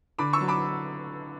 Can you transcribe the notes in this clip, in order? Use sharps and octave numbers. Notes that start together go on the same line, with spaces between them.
D3 B5 D6
C#6 E6
F#3
B5 D6